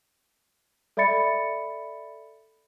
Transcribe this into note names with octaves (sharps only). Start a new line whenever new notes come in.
A4 D5 E5 B5 A6 C#7